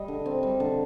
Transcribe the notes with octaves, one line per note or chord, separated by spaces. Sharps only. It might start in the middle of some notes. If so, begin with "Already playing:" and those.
Already playing: G3 D#5
D3
C4
G3
D3